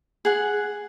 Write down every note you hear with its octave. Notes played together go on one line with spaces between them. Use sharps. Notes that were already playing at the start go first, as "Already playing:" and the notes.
G#4 F#5